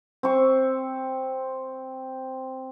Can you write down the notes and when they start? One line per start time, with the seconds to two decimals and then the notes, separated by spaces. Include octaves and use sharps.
0.23 C4 C#6